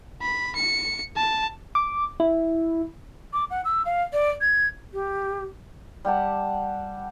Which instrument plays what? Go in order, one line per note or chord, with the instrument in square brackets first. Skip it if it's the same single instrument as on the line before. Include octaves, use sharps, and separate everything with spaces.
[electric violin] B5
C#7
A5
[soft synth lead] D6
E4
[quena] D6
F#5
E6
F5
D5
G#6
G4
[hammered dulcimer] G3 G4 F#5 A5